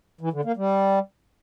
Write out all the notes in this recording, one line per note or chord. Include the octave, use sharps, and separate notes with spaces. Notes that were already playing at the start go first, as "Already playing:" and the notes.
E3
D3
A#3
G3